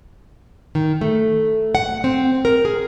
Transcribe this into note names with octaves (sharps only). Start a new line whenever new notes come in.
D#3
A3
F#5
C4
A#4
G#4